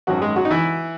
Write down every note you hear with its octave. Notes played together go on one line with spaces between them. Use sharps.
G#1 F#2 D#3 F#3 F#4
G#3 G#4
F#3 F#4
D#4
E3 E4